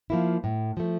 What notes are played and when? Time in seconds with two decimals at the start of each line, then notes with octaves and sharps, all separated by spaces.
0.10 F3 A#3 E4
0.44 A2
0.77 F3 A3